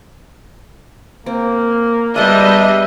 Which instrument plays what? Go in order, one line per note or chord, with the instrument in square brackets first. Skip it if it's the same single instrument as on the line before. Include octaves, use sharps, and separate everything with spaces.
[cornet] A#3 [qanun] C4
[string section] G3 D#5 [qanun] G#3 B3 [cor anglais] D4 [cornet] E5